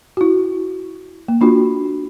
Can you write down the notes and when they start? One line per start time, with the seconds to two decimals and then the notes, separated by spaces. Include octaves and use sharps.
0.17 E4 F#4
1.28 A#3
1.41 A#3 D4 F4 F#4